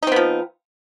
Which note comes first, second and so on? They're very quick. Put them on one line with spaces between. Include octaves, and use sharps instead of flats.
D#4 C4 B3 F3